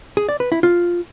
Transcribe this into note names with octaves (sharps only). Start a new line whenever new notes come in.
G#4
D5
B4
E4
F4